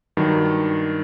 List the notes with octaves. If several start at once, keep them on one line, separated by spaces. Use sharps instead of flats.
G2 D#3 F#3